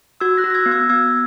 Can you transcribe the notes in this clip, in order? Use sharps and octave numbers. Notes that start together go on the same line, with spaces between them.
F#4 E6 G#6
F#6 A#6
F#4
A#6
E6 G#6
B3
E6 G#6
B3 E6 G#6